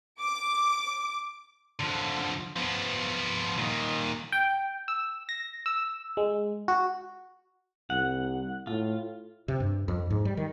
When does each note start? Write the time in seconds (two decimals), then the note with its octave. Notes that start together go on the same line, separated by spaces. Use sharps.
0.18 D6
1.80 D3 F3
2.56 F3 B3
3.58 A#2 D#3
4.32 G5
4.88 E6
5.29 A#6
5.66 E6
6.17 G#3
6.68 F#4
7.90 C2 F#5
8.67 A2 F4
9.48 C3
9.60 G2
9.88 F2
10.10 G#2
10.25 G3
10.37 D#3